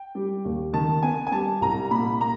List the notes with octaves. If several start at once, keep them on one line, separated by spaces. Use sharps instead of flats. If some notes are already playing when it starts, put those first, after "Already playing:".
Already playing: G5
G3
D#2
D#3 A5
B3 G#5
G#5
G3 A5
C2 A#5
A#2 B5
A#3 A#5